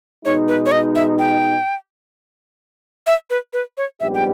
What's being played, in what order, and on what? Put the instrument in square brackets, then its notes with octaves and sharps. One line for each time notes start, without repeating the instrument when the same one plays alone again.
[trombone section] B2 G#3 D#4 [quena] C#5
[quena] B4
C#5
D#5
E5
G5
E5
B4
B4
C#5
[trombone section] A#1 G#2 G3 B3 G4 [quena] E5
[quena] G5